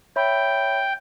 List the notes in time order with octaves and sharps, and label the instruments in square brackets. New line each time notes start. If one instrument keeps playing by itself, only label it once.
[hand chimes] C#5 E5 B5 [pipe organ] G5